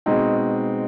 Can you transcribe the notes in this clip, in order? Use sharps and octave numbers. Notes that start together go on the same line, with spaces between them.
B2 G#3 C4 D#4